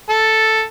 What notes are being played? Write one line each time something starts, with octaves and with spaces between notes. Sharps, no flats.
A4